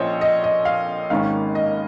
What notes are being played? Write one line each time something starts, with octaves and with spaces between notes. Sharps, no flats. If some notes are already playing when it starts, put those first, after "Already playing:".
Already playing: A#1 A#2 F3 C#4 C5 C#5 D#5
D#5
D#5
F5
G#1 G#2 D#3 A#3 C#4 F5
D#5